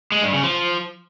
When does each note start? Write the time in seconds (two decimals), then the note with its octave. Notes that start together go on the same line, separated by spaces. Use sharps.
0.12 G#3
0.22 G2
0.33 C#3
0.44 F3